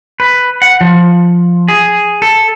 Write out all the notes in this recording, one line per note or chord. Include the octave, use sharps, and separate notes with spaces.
B4
F#5
F3
G#4
A4